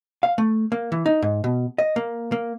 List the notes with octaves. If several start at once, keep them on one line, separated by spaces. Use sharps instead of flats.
F5
A3
A#3
E3
D#4
G#2
B2
D#5
A#3
A#3